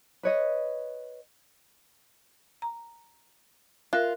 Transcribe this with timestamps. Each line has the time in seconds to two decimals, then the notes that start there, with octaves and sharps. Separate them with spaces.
0.23 B4 C#5 D#5
2.62 A#5
3.93 F4 A#4 E5 F#6